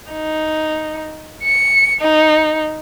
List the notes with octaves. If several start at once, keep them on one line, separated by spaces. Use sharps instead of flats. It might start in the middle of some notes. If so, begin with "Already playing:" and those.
D#4
C#7
D#4